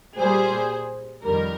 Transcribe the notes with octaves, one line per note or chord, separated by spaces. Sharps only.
A#2 G3 G#4 C5
F2 D#3 G3 A#4